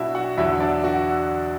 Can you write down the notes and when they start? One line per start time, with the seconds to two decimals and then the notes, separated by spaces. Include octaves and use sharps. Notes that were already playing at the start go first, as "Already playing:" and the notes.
Already playing: B2 F#3 D4 E4 F#4 E5
0.15 F#4 F#5
0.37 E2 D3 F#3 E4 E5
0.60 D4 D5
0.84 F#4